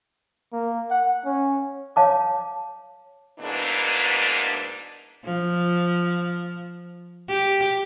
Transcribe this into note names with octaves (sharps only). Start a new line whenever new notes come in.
A#3
F#5
C#4
C#5 F5 A5 D6
E2 G#2 B2 E3 A#3 D4
F3
G4